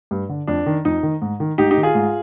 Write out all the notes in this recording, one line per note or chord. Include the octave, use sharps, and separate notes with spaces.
G2
D3
F2 D4
D#3
F2 D#4
D#3
G#2
D#3
G#2 D#4 G4
D#4 G4
D#3
F4 G#4
G#2